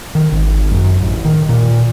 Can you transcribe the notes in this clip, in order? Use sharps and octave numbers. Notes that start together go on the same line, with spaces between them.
D#3
G#1
F#2
A1
D#3
A#2